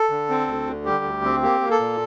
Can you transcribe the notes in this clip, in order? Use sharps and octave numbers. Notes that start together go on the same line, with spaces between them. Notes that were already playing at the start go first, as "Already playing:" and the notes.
Already playing: A4
D3
C4
D2
D3
G3 G4
D2
C4
A#3 G4
A#3
A4
A#2